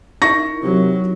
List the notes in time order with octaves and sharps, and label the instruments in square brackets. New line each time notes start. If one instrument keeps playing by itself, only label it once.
[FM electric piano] D#4 E4 A#4 [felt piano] C#6 A#6
[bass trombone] C3 [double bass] F#3